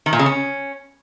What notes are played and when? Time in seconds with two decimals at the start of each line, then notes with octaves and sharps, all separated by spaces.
0.06 D#3
0.13 A#2
0.19 C#3
0.26 C#4